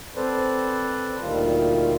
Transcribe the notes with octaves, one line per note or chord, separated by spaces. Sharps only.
C4 A4 B4 C5 D5
D2 A#2 D#3 G3 F4